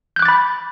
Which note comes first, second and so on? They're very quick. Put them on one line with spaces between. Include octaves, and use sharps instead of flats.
G6 F#6 D6 A6 B5